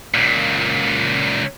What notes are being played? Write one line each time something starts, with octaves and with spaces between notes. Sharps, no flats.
C#2 A#2